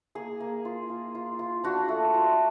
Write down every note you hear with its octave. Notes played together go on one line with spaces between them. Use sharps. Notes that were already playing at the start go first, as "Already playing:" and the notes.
A#3 G#4
A#3
F4
F4
F4
F4
D4 F#4
A3
F4